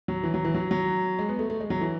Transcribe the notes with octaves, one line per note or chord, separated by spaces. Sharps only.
F#3
E3
F#3
E3
F#3
F#3
G#3
B3
A3
A3
G#3
F#3
E3